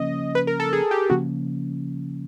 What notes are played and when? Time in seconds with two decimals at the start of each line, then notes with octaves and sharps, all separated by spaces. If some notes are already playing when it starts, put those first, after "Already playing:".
Already playing: C#3 F3 A#3 C#4 D#5
0.35 B4
0.47 A#4
0.60 A4
0.73 G#4
0.91 G4
1.10 C#3 F3 A#3 C#4 F#4